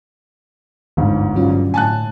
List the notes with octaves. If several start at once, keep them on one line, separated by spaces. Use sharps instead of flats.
G1 D2 G#2
G2 D3 F#3 C#4 F4
A2 G#5 A5 F#6